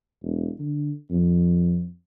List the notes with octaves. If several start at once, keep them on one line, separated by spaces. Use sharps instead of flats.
E1
D3
F2